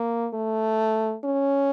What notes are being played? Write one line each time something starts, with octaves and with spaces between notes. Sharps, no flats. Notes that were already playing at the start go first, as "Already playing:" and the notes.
Already playing: A#3
A3
C#4